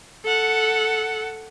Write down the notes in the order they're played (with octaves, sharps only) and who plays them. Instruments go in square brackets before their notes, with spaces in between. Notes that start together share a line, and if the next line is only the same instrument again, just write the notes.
[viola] A4 F#5